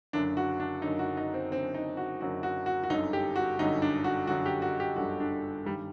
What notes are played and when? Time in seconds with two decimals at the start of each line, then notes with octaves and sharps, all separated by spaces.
0.13 F#1 F#2 D3 D4
0.37 F#4
0.60 D4
0.82 F#1 F#2 D3 D#4
0.99 F#4
1.17 D#4
1.34 C4
1.51 F#1 F#2 D3 C4
1.74 D#4
1.97 F#4
2.21 F#1 F#2 D3 F#4
2.43 F#4
2.66 F#4
2.83 F#4
2.89 G1 F#2 D3 D#4
3.13 G4
3.36 F#4
3.59 G1 F#2 D3 D#4
3.82 D4
4.04 F#4
4.27 G1 F#2 D3 F#4
4.46 G4
4.62 F#4
4.80 G4
4.96 G1 F#2 D3 F#4
5.20 D4
5.66 G1 G2 D#3 G3